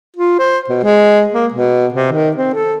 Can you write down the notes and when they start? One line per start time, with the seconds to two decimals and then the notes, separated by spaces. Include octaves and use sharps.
0.16 F4
0.39 C5
0.69 B2
0.83 G#3
1.33 A#3
1.54 B2
1.94 C3
2.12 D#3
2.36 C4
2.54 A4